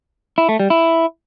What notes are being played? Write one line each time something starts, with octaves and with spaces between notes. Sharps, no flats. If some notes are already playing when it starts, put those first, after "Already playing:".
E4
A3
G3
E4